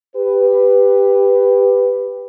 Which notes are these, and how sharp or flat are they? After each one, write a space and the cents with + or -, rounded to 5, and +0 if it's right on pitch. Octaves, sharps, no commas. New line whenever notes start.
G4 +15 B4 +5